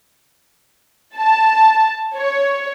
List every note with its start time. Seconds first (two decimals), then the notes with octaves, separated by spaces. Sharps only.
1.17 A5
2.16 C#5